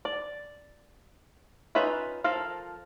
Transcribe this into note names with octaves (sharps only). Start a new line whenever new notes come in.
D5
C#4 D#4 F4 B4 E5
F3 A4 A#4 F5